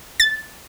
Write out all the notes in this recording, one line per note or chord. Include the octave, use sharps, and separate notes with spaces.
A6